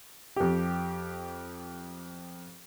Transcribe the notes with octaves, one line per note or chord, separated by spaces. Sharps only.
F2 G4